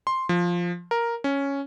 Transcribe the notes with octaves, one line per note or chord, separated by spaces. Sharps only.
C6
F3
A#4
C#4